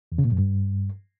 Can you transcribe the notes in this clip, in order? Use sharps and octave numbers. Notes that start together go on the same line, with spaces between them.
E2
C#3
A#2
F#2
G2